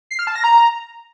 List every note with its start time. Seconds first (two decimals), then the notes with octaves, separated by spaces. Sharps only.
0.11 C7
0.19 F6
0.27 A5
0.35 A#6
0.44 A#5